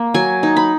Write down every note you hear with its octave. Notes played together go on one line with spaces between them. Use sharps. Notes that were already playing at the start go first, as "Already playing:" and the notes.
Already playing: A#3
F#3 G#5
D#4
B5